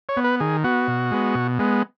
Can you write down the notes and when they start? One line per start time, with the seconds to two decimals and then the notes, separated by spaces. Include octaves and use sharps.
0.09 C#5
0.17 B3
0.24 B4
0.40 D#3 G#4
0.64 B3 F#4
0.88 B2
1.12 G#3 B3
1.35 B2
1.59 G#3 B3